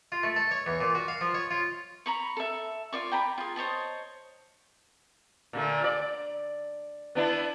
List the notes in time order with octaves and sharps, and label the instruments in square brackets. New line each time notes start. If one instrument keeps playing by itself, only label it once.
[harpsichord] F4
A3
A4
C#5
E2
A#2
F#4
F5
F3
C#5
F4
[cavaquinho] A#5 B5 C#6
A4 E5
F4 D5 C#6
G5 A#5 B5
F4 G#4
C5 C#5 D#5 A5
[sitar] A#2 D3 A3
D5
B3 D4 E4